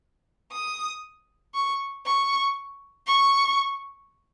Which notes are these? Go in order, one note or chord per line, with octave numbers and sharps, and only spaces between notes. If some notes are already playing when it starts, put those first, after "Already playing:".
D#6
C#6
C#6
C#6